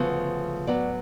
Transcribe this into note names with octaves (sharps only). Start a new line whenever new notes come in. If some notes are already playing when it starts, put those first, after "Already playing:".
Already playing: D2 C#3 F3 B3
A2 F#3 B3 D5